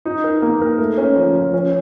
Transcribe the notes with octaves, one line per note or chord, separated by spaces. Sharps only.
D#4
A#4
A#3
A#4
A3
C#4
F3
F3
C#4